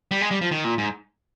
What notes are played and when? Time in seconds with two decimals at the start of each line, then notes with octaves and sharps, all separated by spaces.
0.11 G3
0.21 G#3
0.31 G3
0.42 F3
0.52 D#3
0.64 A#2
0.78 G#2